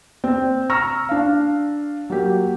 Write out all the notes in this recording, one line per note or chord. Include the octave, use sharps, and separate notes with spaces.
C4
A#5 C#6 E6 F6 A#6
D4 F5
F#3 A#3 G4